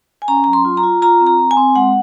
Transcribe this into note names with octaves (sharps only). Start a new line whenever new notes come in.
G#5
C#4 A#5
F#3 A#5
C6
F4
A#5
F4
F4 A#5
C4
A#5
C4
G#5
C4
G#3 F#5